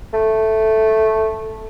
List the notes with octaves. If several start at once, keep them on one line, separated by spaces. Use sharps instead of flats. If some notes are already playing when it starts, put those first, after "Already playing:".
A3